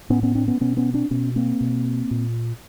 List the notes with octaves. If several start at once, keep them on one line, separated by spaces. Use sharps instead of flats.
A2 B3 C#4
B3 C#4
C4 D4
B3 C#4
B2 B3 C#4
B3 C#4
C4 D4
B2 B3 C#4
A#3 C4
B2
A#2